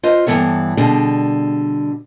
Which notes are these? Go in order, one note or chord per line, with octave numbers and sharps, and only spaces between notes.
F4 B4 C5 D#5
G2 C3 E3 B3 A4 C#5
B2 D3 G3 G#4